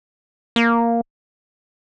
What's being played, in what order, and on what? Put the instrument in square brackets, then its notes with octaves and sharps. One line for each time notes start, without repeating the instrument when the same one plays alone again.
[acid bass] A#3